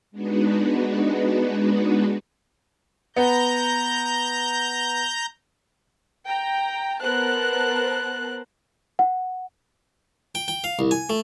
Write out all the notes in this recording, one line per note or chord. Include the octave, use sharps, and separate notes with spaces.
G#3 B3 D4 D#4 F#4 B4
B3 A#5 G6
G5 A#5
B3 A#4 C5 A5 F#6
F#5
G5
G5
F5
C2
G#5
A3